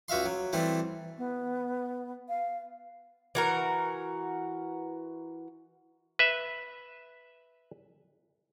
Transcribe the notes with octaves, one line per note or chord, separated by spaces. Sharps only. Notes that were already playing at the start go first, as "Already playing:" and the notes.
C#2 F#4 E5 F5 C6
F#3
E3 G3 A3 C4
B3
F5
E3 F#4 A#4
B4 E5